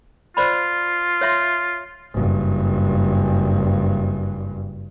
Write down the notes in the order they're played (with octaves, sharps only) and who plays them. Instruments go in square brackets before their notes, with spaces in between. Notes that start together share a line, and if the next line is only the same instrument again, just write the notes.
[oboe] F4 [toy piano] C5 D5 B5
[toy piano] C#5 E5 C6
[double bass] F#1 G2